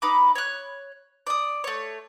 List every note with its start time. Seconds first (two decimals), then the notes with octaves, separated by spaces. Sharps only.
0.02 D#4 B4 B5 D6
0.35 C#5 F#6
1.27 D5 D#6
1.64 A3 C#5